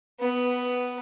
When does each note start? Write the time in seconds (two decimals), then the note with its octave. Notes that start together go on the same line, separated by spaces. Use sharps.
0.20 B3 B4